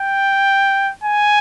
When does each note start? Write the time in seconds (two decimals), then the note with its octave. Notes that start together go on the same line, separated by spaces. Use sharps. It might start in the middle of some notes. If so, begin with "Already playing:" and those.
Already playing: G5
1.04 G#5